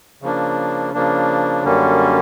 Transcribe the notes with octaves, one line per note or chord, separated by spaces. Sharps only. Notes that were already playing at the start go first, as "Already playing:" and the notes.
C#3 F3 A#3 D4
C#3 F3 A#3 D4
F#2 D3 G3 A#3 C#4